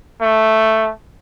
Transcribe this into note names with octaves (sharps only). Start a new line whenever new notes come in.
A3